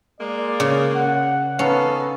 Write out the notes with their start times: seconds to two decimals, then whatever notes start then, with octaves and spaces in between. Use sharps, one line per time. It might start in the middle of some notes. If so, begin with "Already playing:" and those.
0.20 G#3 A#3 D5
0.60 C#3
0.95 F#5
1.59 B3 C#4 D#4 A4 F5